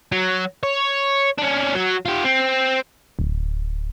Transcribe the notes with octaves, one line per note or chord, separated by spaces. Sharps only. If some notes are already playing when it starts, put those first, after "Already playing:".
F#3
C#5
C#4 D4
F#3
F4 G4
C4
D1